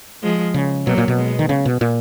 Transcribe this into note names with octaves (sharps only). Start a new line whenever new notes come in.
F3 G#3
C#3
B2 F#3 A#3
A#2
B2
G#3 B3
D#3
C#3
B2
A#2